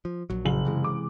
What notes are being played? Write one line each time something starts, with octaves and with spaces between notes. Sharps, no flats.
F3
A#1 F#3
F#1 F#7
C3 E3 G#3
D6